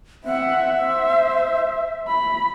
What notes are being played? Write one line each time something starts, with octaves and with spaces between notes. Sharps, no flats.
C4 E5 F#5
C5
B5